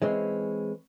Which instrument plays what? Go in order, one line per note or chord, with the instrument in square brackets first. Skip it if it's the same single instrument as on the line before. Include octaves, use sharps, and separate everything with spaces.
[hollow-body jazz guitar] E3 G#3 C4 C#4